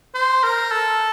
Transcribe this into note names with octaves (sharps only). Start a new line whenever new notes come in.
C5
A#4
A4